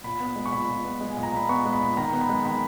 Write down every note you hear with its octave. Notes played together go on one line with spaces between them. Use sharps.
A#2 B5
B3
G#3
C#6
A#2 B5
A#2
B3
G#3
G#5
A#2
A#5
A#2 B5
B3 C#6
G#3
B5
A#2
D#3 A#5
B3
B5
G#3
D#3 B5